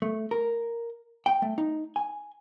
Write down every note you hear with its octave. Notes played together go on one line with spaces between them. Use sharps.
A3
A#4
G5
A3
D#4
G#5